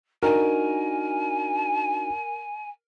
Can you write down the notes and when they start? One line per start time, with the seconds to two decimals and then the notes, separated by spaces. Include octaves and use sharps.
0.23 D4 D#4 F#4 A#4 G#5